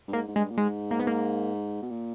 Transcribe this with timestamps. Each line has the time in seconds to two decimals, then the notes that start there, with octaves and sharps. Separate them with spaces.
0.08 G2
0.13 G#2 A#3
0.28 G#2
0.36 G2 G#3
0.51 A#2
0.58 G#2 G#3
0.91 A#3
1.00 B3
1.07 A#3
1.82 B2
1.90 A#2